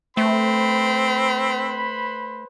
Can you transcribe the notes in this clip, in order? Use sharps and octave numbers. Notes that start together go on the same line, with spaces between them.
A3 C4 B4 C5 B5